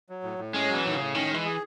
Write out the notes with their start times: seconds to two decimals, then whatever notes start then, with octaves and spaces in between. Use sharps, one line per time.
0.09 F#3
0.23 A2
0.39 A2
0.53 G#3 C#4
0.69 E3 F#3
0.85 A2 D#3
0.95 C#3
1.00 A2
1.14 D#3 C#4
1.29 G#3
1.34 E3
1.45 G#4